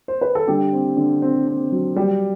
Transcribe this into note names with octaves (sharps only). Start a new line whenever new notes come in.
C5
B4
A4
D3 G3 G4
C4
D3
C4
C4
F#3
G3 G4